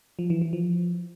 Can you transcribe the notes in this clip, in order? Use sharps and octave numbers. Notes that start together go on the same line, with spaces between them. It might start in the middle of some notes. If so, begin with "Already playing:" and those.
F3
E3
E3
F3